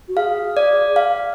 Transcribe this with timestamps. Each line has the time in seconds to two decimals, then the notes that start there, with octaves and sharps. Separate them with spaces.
0.08 F#4
0.16 G#4 F5
0.57 D5
0.96 F5